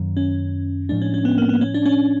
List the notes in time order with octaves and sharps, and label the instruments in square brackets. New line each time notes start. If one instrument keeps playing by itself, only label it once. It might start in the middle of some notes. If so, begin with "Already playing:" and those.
Already playing: [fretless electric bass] F#2 D#3 F#3 A#3
[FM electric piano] C#4
[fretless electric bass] A2 F3 G#3 [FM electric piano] D4
[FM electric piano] C#4
C#4
B3
A#3
B3
C#4
D4
C#4